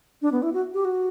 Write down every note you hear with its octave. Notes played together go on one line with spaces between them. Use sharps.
D4
B3
E4
F#4
G4
F#4